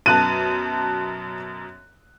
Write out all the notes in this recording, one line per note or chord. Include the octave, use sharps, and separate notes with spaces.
F#2 B2 A5 F#6 D#7